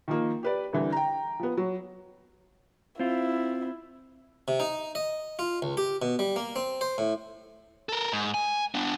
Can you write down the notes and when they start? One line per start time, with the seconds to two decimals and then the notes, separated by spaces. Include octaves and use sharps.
0.08 D#3 F3 A#3
0.43 G4 B4 D5
0.73 C2 D3 E3
0.92 G5 A#5
1.39 F3 B3
1.57 F#3
2.99 C4 E4 F4
4.48 C3
4.60 D#4
4.95 D#5
5.39 F4
5.62 C#2
5.77 G4
6.02 B2
6.19 G3
6.36 A#3
6.56 C4
6.81 C5
6.98 A2
7.89 A4 A#4
8.13 G#2
8.34 G#5
8.75 B3 D4